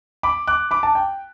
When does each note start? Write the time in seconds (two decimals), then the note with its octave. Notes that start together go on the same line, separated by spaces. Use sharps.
0.23 B5 D6
0.47 D6 F#6
0.71 B5 D6
0.83 A5
0.95 G5